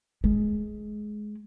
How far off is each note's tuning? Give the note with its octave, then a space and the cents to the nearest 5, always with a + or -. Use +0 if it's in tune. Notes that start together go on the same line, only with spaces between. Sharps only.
G#3 +15